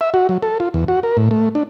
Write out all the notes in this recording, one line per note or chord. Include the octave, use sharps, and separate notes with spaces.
E5
F#4
F#3
A4
F4
E2
F#4
A#4
A2
A3
D4